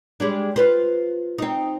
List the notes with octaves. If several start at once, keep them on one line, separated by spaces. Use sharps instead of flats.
G3 G#3 D4
F4 B4 C5
C4 D#4